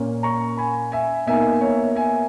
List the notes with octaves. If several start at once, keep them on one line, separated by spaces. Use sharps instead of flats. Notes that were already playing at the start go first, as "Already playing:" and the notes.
Already playing: A#2 A#3 C#4
A#5 C#6
G#5 B5
E5 G#5
B2 A#3 D#4 E5 G#5
C#5 E5
E5 G#5